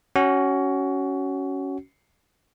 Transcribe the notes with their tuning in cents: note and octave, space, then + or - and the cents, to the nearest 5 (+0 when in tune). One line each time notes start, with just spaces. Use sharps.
C#4 +5 F#4 +20